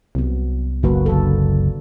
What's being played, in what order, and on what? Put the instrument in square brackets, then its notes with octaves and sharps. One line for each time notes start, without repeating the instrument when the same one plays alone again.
[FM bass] C2 [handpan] F#3 B3
[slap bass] F#1 [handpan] A#3 F#4 B4
[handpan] D3 A4